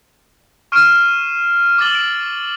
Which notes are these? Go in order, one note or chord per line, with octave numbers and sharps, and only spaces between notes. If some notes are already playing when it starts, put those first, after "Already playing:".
C#6 F6 C7 D7 E7
D6 E6 F6 A6 F#7 G7
D7